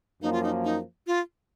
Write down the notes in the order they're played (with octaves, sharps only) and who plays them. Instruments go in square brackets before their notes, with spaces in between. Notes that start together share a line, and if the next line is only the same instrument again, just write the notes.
[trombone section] F#2 F3 A#3 [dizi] D#4
[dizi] F4
D#4
D#4
F4